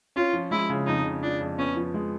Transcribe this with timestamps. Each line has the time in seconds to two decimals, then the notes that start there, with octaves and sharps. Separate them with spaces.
0.16 C#4 F4
0.33 F3
0.51 G#3 E4
0.70 C#3
0.87 F2 D#4
1.05 C#3
1.22 F3 D4
1.41 F2
1.58 B3 C#4
1.76 F3
1.94 G#3